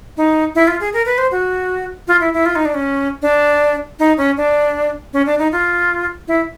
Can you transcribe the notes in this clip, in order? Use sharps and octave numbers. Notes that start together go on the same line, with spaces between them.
D#4
E4
F4
G#4
A#4
B4
C5
F#4
F4
E4
E4
F4
D#4
D4
C#4
D4
D#4
C#4
D4
C#4
D4
D#4
F4
E4